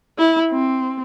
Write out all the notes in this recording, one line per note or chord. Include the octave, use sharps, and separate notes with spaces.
E4
C4